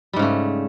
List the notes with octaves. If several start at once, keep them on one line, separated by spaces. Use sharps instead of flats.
G#2 C#3 G3 A3